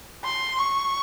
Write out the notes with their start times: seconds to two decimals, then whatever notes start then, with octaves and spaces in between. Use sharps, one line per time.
0.25 C6
0.59 C#6